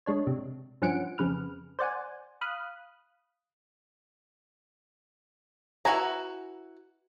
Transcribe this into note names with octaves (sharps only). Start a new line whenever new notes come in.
G#3 D4 C#5
C3
G2 F3 C#4 F#5 C#7 D7
F2 C#3 B4 F6
C5 D5 F#5 G#5
F5 B5 D#6 F#6
E4 F#4 B4 G#5 A#5